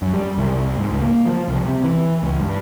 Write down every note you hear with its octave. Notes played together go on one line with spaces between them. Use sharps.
F#2
G3
C2
G#2
C#2
A#3
F3
C2
C3
E3
C#2
G2